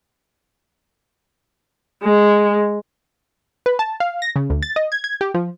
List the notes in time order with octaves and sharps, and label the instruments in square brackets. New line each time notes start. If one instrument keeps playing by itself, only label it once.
[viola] G#3
[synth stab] B4
A5
F5
A#6
C#3
D2
A6
D#5
G#6
G#6
G4
F3